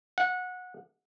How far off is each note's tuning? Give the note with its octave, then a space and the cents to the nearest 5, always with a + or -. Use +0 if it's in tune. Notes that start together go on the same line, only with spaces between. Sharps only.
F#5 -20